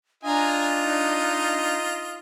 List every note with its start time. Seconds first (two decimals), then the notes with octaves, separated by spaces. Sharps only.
0.23 D4 F4 D#5 G#5 A#5
0.82 D#4